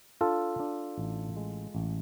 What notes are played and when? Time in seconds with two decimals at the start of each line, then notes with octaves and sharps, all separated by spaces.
0.21 D4 F4 A4
0.60 D4
0.98 A1
1.36 G#3
1.75 A1